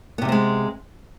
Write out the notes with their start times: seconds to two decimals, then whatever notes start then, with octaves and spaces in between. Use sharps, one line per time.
0.18 B3
0.22 C3
0.25 G3
0.29 C4
0.32 G#3